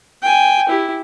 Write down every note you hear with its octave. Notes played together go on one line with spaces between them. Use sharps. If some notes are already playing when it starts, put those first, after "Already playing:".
G5 G#5
E4 G4